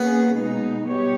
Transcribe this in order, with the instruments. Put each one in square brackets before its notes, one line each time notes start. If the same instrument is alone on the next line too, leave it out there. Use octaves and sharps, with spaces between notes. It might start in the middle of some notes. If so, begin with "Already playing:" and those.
Already playing: [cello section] A#3 C#4 G#4 [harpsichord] B3
[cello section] B2 G#3 D#4
B2 G3 B3 G4 C#5